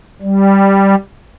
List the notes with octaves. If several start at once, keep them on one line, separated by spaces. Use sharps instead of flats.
G3